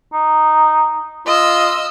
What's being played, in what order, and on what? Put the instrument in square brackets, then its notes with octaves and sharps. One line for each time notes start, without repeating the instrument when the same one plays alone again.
[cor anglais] D#4
[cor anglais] F4 [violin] D#5 E6